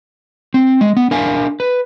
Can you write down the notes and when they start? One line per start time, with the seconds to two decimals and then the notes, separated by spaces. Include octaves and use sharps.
0.54 C4
0.81 G#3
0.97 B3
1.11 D4 A#4 F5 G#5
1.60 B4